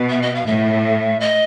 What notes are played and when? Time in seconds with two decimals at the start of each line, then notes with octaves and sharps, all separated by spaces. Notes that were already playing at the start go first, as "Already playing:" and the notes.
Already playing: B2
0.10 E5
0.22 D#5
0.35 F5
0.47 A2 E5
1.20 D#5